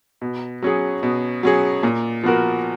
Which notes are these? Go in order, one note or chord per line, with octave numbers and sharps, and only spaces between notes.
B2
F#3 C#4 G#4
B2
F#3 C#4 G#4
A#2
F3 B3 F#4 A#4